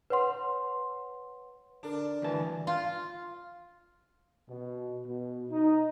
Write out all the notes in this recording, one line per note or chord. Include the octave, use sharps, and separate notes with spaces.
B4 C#5 F#5 C6
D3 D4 A#4
D2 G2 E3 A5
F4
B2
B2
D#4